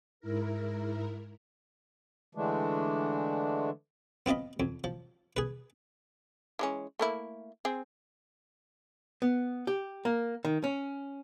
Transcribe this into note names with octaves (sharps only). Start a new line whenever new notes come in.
G#2 E4 A#4
D3 E3 G#3 A3 D4
B3 C4 F4 D#5 B5
F2
F3
G#4 B4
E3 G#3 C#4
A3 A#3 E4
C4 G#4
B3
G4
A#3
D#3
C#4